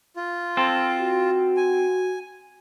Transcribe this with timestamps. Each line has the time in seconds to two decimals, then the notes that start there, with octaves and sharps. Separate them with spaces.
0.16 F4
0.57 C4 A4
0.99 F#4
1.57 G#5